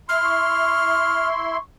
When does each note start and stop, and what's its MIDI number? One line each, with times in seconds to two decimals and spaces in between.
0.09 1.57 64
0.09 1.57 84
0.09 1.28 89
0.24 1.62 85